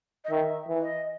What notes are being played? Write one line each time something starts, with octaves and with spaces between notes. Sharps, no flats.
D#5
D#3 E5
E3
D#5